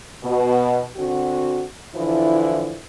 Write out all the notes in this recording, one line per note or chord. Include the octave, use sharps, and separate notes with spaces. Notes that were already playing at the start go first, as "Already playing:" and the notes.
B2
D3 C4 F#4
D3 E3 F3 E4